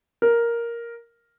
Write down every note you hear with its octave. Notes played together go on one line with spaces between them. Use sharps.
A#4